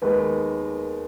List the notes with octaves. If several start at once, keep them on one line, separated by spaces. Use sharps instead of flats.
D#2 D#3 G#3 B3 B4